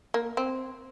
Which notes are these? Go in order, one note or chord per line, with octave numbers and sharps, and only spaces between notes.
A#3
C4